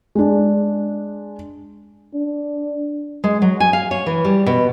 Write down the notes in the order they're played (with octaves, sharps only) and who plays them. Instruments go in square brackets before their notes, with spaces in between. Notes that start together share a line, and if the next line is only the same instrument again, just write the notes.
[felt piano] G#3 D4
[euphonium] D4
[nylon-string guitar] G#3
F#3
G#5
F5
C#5
E3
G3
B2